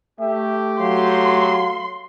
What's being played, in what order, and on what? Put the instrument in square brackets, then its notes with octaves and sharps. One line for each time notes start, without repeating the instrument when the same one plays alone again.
[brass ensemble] A3 G4 [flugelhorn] E5
[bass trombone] F#3 [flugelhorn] F5 [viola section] C6